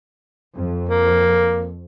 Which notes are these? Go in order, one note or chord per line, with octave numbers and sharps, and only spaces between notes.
F2
A#3